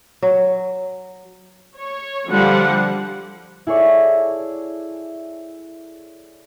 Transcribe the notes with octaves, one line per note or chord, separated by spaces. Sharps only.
F#3
C#5
D3 F3 G3 F#5
E4 G#4 A4 C#5 D5